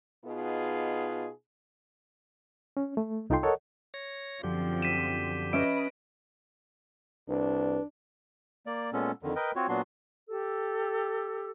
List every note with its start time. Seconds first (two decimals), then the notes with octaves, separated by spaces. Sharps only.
0.25 B2 B3 D#4 F4 G#4
2.77 C#4
2.97 A3
3.30 C2 D#4 F4 A4 G5 C6
3.43 A4 A#4 C#5 D#5 F#5
3.94 C#5 A#6
4.44 F#2 D3 F3 C4 G4
4.82 B6 D#7 E7
5.53 C#4 B4 D#5 E5 D7
7.29 C2 D4 B4
8.67 A#3 D5
8.93 A#2 G#3 B3 C#4 A4
9.23 F2 D3 D#3
9.36 A#4 B4 D#5 G5
9.56 C4 F4 F#4 C#5
9.69 A#2 F#3 B3 D4 F#4 C6
10.28 G4 A4 E6